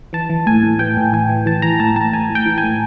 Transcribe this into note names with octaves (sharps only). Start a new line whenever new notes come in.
E3 A5
E3
A2 G#5
A2
E3 G5
A2
E3 G#5
E3
E3 A5
E3 A#5
A2 A5
A2 A5
A2 G#5
A2
G5
E3
G#5
A2